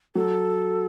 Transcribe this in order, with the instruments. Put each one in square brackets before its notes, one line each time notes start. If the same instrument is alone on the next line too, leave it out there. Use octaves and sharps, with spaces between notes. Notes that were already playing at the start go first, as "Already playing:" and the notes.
[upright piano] F#3 [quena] A4